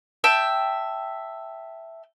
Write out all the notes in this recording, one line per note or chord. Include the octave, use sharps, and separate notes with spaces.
E5 G5 A5